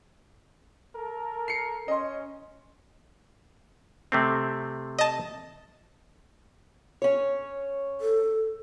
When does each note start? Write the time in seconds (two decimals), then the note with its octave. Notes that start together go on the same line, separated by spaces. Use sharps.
0.96 A4 A#4
1.48 C7 C#7
1.88 C#4 D#5 C6
4.12 C3 A3 C4
4.98 D#5 A5
7.02 C#4 C#5
8.01 A4